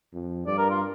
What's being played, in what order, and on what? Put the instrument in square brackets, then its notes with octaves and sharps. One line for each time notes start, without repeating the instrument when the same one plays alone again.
[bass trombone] F2
[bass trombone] G2 [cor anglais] D5
[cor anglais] A#4
F4